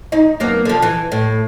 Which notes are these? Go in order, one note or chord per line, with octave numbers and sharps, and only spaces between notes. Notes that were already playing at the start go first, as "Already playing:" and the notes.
D#4
F#2 A#3 B3
D3 F3
E3
A2